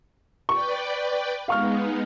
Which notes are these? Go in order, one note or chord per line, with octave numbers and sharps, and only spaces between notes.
B4 D5 G5 C#6
G#3 B3 D#4 F5 C#6 F6